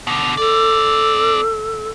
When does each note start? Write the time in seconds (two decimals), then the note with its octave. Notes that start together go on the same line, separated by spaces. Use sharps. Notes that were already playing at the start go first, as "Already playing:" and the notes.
0.07 B2 D3
0.37 C4 A4 D5